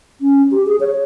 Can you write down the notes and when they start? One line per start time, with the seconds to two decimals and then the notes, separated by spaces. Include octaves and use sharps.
0.21 C#4
0.51 G4
0.66 G#4
0.80 C#5